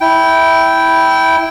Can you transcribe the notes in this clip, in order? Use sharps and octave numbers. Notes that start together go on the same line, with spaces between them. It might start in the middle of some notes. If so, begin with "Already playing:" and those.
E4 G5